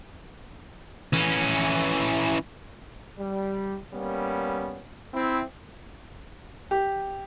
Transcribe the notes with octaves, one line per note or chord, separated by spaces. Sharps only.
E3 C#4
G3
G3 A#3 B3 C#4
C4 E4
G4